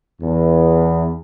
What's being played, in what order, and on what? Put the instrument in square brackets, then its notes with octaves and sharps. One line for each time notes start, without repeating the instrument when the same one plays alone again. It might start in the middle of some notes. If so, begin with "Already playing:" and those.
[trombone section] E2